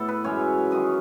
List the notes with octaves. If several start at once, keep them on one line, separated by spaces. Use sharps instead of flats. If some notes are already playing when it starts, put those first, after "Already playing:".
Already playing: A2 B3 A4
B4
F#2 E3 G#3 C#4 C#5
F#2 D#3 F#3 D#5